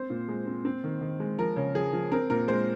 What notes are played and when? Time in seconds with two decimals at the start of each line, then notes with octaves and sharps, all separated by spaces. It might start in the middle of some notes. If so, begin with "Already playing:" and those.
Already playing: C4 C5
0.10 A#2
0.28 G#3
0.47 C4
0.65 C4
0.84 D#3
1.01 D#3
1.20 G#3
1.38 F3 A#4
1.56 C#3
1.75 F3 G#4
1.93 F3
2.12 C4 A#4
2.30 A#2 A#4
2.48 G#3 C5